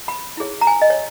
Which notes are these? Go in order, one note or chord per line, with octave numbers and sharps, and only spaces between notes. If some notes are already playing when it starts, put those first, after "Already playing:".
B5
E4 G#4 C#5
A#5
G#5
D#5
C#5